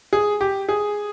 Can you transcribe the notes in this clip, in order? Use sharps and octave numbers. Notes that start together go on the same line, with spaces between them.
G#4
G4
G#4